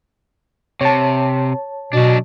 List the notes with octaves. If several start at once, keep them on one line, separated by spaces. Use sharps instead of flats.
C3 C#5 A5
B2 F#3 D4